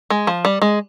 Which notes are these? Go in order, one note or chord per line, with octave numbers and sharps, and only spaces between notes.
G#3
F3
G3
G#3